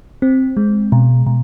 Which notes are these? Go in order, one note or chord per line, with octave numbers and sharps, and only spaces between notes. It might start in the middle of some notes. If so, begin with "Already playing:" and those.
C4
G#3
B2
B2